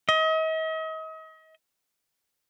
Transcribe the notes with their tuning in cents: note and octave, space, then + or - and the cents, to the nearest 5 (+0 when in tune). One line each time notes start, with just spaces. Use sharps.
D#5 +40